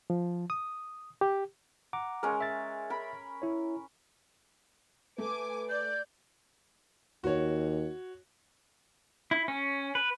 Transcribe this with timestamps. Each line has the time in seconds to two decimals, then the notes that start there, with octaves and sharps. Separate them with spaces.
0.10 F3
0.50 D#6
1.21 G4
1.93 F#5 A#5 D6
2.23 G#3 C#4 A#4
2.41 E5 A6
2.90 A#4 B5
3.42 E4 C#5
5.18 A3 B4 G#5 D6
5.69 D5 G6
7.24 D#2 F#4 C#5
9.31 E4
9.48 C#4
9.95 B4